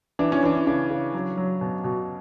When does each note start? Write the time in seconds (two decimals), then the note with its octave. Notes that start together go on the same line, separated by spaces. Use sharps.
0.19 E3 D4
0.32 C#4
0.43 E3 D4
0.66 C#3 D4
0.90 C#3
1.14 F#3
1.37 F#3
1.61 B2
1.84 B2